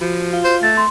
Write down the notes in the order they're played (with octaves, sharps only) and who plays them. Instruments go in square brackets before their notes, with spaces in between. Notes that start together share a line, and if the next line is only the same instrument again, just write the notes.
[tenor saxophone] F3 [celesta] F#4
[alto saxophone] F4
[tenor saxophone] C5
[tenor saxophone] A3 [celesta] A6
[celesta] C6